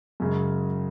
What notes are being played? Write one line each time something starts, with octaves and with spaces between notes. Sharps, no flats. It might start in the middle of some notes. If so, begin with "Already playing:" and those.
F#2 C#3 G#3